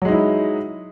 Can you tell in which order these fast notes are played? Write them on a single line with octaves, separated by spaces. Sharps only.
F#3 G#3 D#4 E4